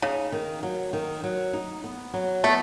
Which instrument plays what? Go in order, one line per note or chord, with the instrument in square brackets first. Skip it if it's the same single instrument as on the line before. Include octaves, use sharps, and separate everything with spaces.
[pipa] C#3 [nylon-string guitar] D#4
[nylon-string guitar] D#3
F#3
D#3
F#3
D#4
B3
F#3
[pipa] A3 [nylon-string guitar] B3